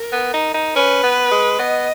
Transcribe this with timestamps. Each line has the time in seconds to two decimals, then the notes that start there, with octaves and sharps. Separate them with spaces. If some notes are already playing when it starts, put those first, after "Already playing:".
Already playing: A#4
0.12 B3
0.33 D#4
0.54 D#4
0.75 C#4 B4
1.03 B3
1.31 G#3
1.59 B3 D#5